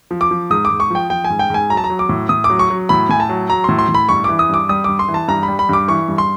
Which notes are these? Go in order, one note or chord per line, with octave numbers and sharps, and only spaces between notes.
F3
D6
F3
G#2 D#6
D6
G#2
C#6
F3 G5
F3 G5
G#5
G#2
G5
G#2 G#5
F#3 A#5
A5
A#5
F#3
D6
A2
A2 D#6
D6
F#3
C#6
F#3
A2 B5
A2 G#5
A5
F#3
F#3 A#5
A2 C6
C6
A2
B5
G2 C#6
E3 D6
D#6
G2 D6
G3 D#6
G2 D6
C6
E3
A5
G2 A#5
B5
G3
B5
G2 D6
E3 C#6
G2
C6